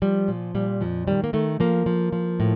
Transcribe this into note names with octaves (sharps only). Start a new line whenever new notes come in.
F3 G3
A#2
A#2 G3
F2 F3
D#3 G3
A#3
D#3 A3
F3 A#3
F3
F3
A2